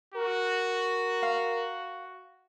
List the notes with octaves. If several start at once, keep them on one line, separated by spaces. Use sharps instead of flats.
F#4 A#4
F5 C6